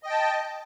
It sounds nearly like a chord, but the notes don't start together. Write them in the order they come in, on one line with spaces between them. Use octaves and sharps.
D#5 G5 A5